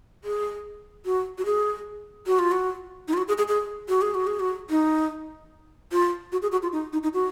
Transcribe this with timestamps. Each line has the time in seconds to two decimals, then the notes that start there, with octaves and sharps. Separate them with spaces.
0.24 G#4
1.06 F#4
1.38 F#4
1.46 G#4
2.27 F#4
2.39 F4
2.51 F#4
3.08 D#4
3.13 F4
3.17 F#4
3.28 G#4
3.38 G#4
3.48 G#4
3.89 F#4
4.02 G#4
4.15 F#4
4.27 G#4
4.40 F#4
4.70 D#4
5.92 F4
6.32 F#4
6.42 G#4
6.52 F#4
6.63 F4
6.73 D#4
6.93 D#4
7.03 D#4
7.14 F#4